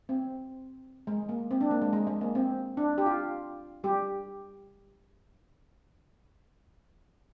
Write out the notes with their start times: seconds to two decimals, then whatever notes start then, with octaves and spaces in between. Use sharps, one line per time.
0.09 C4
1.07 G#3
1.29 A#3
1.51 C4
1.61 D4
1.71 A#3
1.82 G#3
1.93 G#3
2.07 G#3
2.21 A#3
2.35 C4
2.77 D4
2.98 G4
3.06 F4
3.84 G3 G4